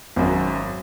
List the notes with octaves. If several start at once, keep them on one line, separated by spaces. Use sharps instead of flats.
G#1 F#2